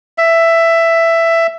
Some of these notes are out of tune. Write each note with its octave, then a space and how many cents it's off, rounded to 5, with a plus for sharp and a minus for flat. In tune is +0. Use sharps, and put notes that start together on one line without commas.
E5 +10